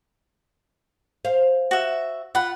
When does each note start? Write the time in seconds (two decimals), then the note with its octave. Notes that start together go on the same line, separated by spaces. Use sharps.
1.25 C5 F5
1.71 F#4 E5
2.35 F4 F#5 B5